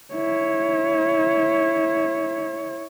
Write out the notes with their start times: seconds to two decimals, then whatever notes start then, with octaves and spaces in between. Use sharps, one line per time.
0.14 E4 C#5